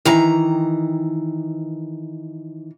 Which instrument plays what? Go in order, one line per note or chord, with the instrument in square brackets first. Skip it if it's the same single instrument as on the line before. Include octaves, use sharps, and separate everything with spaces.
[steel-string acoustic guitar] D#3 E3 A#5